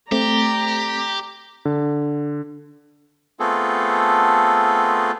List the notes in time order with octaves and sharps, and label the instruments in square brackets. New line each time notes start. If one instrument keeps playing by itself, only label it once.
[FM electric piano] A3 C4 [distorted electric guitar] G4 [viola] D5 A#5
[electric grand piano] D3
[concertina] A3 B3 C4 F4 G#4 A4